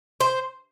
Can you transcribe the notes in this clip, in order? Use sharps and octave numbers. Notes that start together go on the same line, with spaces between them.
C5